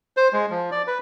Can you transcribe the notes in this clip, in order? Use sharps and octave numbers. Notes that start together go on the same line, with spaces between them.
C5
G#3
F3
D5
B4